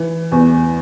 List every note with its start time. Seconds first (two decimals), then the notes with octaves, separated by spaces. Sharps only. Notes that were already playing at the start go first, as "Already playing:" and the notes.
Already playing: E3
0.32 E2